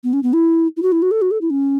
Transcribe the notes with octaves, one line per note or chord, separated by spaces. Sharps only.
B3
C#4
B3
E4
E4
F#4
E4
F#4
A4
F#4
A4
E4
C#4